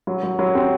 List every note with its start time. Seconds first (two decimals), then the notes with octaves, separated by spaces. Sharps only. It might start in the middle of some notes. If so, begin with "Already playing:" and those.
0.07 F#3
0.23 F#3
0.39 F#3
0.55 C4